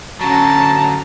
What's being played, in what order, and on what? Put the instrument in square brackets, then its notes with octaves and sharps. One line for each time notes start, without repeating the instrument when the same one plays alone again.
[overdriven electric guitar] D3 F#3 [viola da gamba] C#4 F#4 [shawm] A5 [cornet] A#5